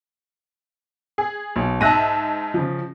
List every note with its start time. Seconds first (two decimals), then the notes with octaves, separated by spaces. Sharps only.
1.18 G#4
1.56 B1
1.81 G#2 E5 A5 F#6 A#6 D#7
2.54 C#3 F3